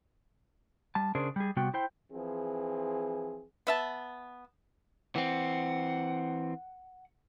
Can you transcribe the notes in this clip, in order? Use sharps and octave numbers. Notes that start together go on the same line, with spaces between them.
G3 A5
C#3 C#4 D4 G#4 A#4 C5
G3 G#4
C3 G3 B3 F#4 G5
E4 C5 G5
E3 F3 C4 G#4
B3 E5 A5
E3 C4 F#5